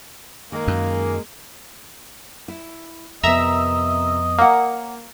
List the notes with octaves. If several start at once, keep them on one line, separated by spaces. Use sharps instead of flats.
D#3 G#3 A#3
F#2
E4
F2 C3 B3 A#4 D#5 E5 A#5 E6
A#3 C#5 F#5